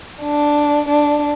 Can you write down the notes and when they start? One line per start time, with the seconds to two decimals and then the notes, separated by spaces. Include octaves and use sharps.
0.22 D4
0.88 D4